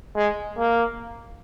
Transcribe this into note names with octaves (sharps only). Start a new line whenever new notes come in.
G#3
A#3